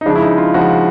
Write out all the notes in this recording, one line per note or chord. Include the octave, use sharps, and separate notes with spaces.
D#4
C#3 F3 G#3 D4
E4
D#4
F4
C#3 F3 G#3 F#4